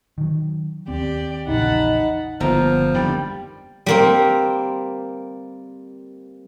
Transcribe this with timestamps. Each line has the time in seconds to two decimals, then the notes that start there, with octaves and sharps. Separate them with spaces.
0.18 D#3 F#3
0.88 D#2 C4 G4 D5
1.47 A#1 E2 C#3 D#4 F#5 A5 B5
2.40 G1 F3 A#3 B3 A#4
2.94 F2 D3 D#3 G3
3.86 G3 A#3 C4